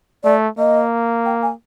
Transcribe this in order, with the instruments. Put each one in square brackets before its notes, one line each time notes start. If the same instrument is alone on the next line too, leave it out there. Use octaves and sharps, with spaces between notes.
[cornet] A3 [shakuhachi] D5
[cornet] A#3 [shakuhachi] D#5
[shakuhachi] G5
G#5